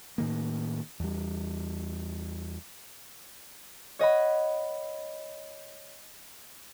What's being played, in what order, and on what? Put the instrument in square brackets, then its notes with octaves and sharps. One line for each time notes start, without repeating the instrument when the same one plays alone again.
[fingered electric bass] A2 D#3 A#3
E2 G3
[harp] C#5 D#5 F#5 B5